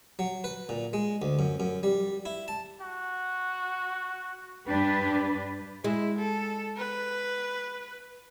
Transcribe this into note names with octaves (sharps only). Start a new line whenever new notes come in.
F#3
B4
A#2
G#3
D2
F#2
F#2
G3
E4
A5
F#4
G2 D4 G4 B4
G#3 E4
A4
B4